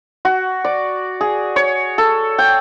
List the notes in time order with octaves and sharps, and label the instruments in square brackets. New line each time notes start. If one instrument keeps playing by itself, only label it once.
[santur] F#4
D5
G#4
C#5
A4
G5